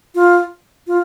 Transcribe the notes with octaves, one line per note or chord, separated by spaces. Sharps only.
F4
F4